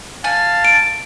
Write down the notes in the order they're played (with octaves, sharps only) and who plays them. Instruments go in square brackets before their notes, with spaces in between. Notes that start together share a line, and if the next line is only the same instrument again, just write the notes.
[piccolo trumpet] F5 [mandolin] G#5 [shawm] A5
[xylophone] D7